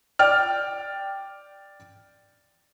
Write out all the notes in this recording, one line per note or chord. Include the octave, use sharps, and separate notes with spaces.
D5 G5 F6